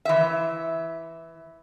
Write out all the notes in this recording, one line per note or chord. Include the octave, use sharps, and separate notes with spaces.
E3 E5